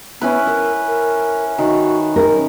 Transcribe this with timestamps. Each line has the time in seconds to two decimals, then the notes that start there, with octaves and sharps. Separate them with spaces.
0.21 B3 C#4 E4 B4
0.47 A#4 E5
0.87 A#4
1.58 D#3 F#4
2.16 C#4 A#4